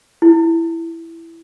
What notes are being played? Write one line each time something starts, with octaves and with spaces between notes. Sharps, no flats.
E4